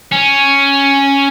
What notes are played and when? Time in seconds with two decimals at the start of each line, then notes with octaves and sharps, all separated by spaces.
0.12 C#4